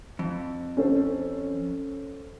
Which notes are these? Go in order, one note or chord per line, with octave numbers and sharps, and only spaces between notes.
F2
C#4 A4 C5